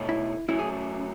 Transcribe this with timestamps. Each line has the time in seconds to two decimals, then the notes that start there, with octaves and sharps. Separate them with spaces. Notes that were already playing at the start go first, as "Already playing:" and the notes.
Already playing: B2 A3 D#4 A4 C#5
0.09 E4
0.48 F#3 A3 C#4 E4
0.59 G#4